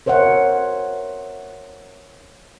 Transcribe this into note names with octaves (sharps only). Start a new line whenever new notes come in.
A#4 C5 C#5 E5 F#5